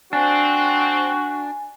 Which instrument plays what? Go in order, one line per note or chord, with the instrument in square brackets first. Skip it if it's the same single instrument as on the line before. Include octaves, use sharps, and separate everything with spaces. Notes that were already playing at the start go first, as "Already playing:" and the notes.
[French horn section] C4 [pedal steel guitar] D4 [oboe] F#4 [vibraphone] G#5